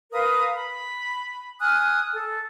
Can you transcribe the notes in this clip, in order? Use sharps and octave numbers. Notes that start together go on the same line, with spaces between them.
A#4 B4 F5 D#6
B5
G#5 D#6 F6 F#6
A4